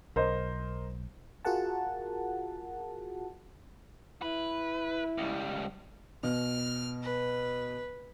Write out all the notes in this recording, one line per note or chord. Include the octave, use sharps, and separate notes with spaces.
B1 A#4 C5 D#5
F4 F#4 G#4 A#4 F#5 A5
E4 B4
C#2 G3
B2 F6
B4